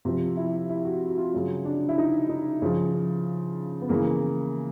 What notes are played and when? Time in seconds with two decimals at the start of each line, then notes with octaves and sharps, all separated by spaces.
0.05 C3 F3 F4
0.37 E4
0.70 E4
0.85 F#4
1.07 F#4
1.18 F4
1.34 C#3 F#3
1.65 D4
1.89 E4
1.98 D#4
2.29 D#4
2.62 C#3 F3
3.82 B3
3.89 C#3 E3 A#3